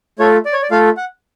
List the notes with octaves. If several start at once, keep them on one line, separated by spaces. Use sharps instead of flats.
A3 F4 A4 C#5
D5
C#5
D5
A3 F4 A4 F5
F#5